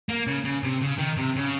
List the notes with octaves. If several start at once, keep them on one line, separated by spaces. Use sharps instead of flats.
A#3
C#3
C#3
C3
C#3
D#3
C3
C#3